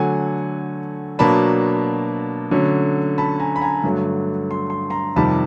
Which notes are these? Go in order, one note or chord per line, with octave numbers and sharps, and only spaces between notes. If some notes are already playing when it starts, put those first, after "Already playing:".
Already playing: D3 F#3 A3 F#5 G#5
B2 F#3 A#3 D4 A5 B5
D3 F#3 A3 C#4
A5 B5
G#5 A#5
B5
G#5 A#5
G2 D3 F#3 A3
C6
C6
A#5 C6
F2 C3 D#3 G3 A5 B5